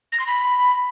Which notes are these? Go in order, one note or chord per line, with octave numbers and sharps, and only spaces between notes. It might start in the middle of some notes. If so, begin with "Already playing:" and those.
A#6
C6
B5